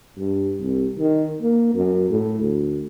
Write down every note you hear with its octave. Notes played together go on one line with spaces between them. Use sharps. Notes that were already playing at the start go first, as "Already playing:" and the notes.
G2
C2
D#3
A#3
F#2
A2
D2